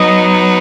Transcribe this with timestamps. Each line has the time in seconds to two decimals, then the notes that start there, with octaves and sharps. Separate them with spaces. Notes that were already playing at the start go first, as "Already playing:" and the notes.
Already playing: F#3 B3 D#4 D#5